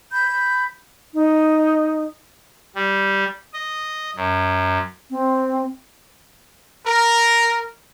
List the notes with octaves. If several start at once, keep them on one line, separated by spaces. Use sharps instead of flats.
B5 G6
D#4
G3
D#5
F#2
C4
A#4